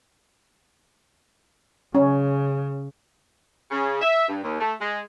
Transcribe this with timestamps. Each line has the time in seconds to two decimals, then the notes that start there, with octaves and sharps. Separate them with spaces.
1.95 C#3 C#4
3.71 C#3
4.01 E5
4.29 G2
4.43 D#2
4.60 A3
4.80 G#3